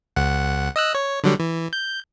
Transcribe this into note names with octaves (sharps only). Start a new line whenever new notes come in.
C#2 F#5
D#5 E6 F#6
C#5
D3 F#3 G3
E3
G6